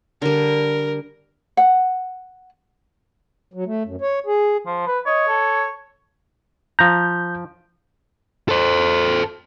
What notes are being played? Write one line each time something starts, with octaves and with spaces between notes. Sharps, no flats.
D3 G3 A#4
F#5
F#3
A3
F#2
C#5
G#4
F3
B4
C#5 D#5
A4
F3 A#5 G6
A4 C5